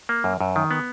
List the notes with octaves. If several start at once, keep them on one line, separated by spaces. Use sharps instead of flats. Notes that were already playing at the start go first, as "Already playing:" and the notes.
A#3
F#2
F#2
D#3
B3